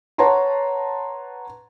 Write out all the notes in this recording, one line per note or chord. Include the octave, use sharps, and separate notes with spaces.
B4 C#5 F#5 A5 A#5 C6